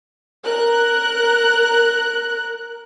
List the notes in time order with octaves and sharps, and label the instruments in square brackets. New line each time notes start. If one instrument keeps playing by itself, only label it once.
[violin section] A#4 F#6